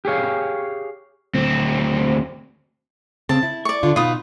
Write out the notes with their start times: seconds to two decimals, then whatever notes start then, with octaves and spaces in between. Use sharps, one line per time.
0.05 G4 G#4 C#5 F5
1.34 D2 C4
3.29 C#3 C4 A5
3.43 E4
3.65 D5 C#6
3.83 D3 F4
3.96 B2 D#4 F4 B4 D#6